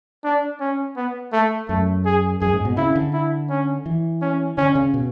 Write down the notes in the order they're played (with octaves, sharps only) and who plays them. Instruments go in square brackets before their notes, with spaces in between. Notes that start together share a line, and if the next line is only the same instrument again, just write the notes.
[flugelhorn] D4
C#4
B3
A3
[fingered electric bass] F#2 [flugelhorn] A3
[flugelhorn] G#4
[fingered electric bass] F#2 [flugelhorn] G#4
[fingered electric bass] G#2
B2
[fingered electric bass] C#3 [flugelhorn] E4
[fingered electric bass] D3
[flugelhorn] E4
C#4
[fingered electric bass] E3
[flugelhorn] C#4
[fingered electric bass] D3 [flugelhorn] C#4
[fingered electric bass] C#3
B2